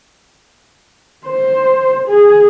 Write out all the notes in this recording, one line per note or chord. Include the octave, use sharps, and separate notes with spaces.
C5
G#4